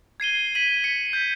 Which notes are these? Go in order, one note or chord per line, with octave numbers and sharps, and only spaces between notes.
G#6 C7 D#7 G7
B6 D#7 F#7
B6 C#7
G6